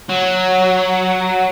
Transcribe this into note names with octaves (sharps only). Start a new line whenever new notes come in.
F#3